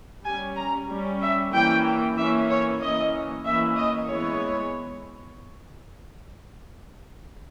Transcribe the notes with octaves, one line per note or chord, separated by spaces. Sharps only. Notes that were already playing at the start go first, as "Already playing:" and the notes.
G3 C#4 G#5
A#5
G3 C#4
E5
E3 A#3 C#4 G5
E3 A#3 C#4 E5
C#5
E3 A#3 C#4 D#5
E3 A#3 C#4 E5
D#5
E3 G#3 B3 C#5